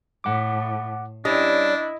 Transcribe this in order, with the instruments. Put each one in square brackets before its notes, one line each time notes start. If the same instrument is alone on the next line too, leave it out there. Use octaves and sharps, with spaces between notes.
[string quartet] A2 [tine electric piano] F#5 D6
[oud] G3 C#4 [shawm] D4 [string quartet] E4 [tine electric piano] D#5